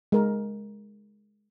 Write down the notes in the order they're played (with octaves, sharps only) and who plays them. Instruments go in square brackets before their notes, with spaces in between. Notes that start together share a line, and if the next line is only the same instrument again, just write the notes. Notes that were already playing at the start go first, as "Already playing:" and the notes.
[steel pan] G#3 A#4